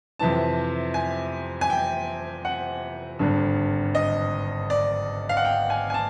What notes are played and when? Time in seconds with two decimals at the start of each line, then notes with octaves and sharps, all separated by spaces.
0.19 F2 C3 E3 A5
0.94 G#5
1.61 G#5
1.70 G5
2.45 F#5
3.19 G#1 G2 D3
3.95 D#5
4.70 D5
5.29 F5
5.37 F#5
5.45 G5
5.70 G#5
5.90 G#5
5.94 A5